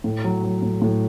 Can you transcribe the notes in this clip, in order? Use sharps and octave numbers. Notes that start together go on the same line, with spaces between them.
A2
F#3
F#3
A2
A2